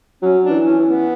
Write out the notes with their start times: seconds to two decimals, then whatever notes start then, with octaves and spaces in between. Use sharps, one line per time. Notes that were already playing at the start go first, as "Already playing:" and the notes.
0.22 F#3 C#4
0.43 D4
0.50 E3
0.64 C#4
0.79 E3
0.86 B3